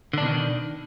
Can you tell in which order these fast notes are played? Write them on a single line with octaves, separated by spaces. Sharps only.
D3 D4 B2 D#3